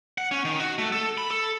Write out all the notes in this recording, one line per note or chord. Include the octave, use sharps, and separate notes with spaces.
F#5
C#4
D#3
F#4
A3
A4
B5
A4